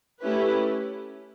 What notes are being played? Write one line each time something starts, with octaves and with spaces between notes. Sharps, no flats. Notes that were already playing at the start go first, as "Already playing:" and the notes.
A3 C#4 E4 G4 B4